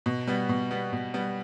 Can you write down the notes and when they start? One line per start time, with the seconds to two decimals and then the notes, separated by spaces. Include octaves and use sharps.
0.06 B2
0.27 G3 B3
0.49 B2
0.71 G3 B3
0.93 B2
1.14 G3 B3